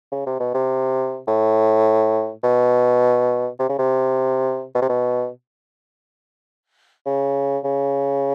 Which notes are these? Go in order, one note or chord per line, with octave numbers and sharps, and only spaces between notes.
C#3
C3
B2
C3
A2
B2
C3
C#3
C3
B2
C3
B2
C#3
C#3